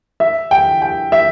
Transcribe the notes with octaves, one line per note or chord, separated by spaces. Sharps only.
E5
G5
G5
E5